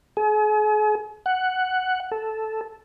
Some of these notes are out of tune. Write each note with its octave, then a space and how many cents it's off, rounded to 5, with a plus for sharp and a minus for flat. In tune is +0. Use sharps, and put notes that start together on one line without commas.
G#4 +40
F#5 +5
A4 -5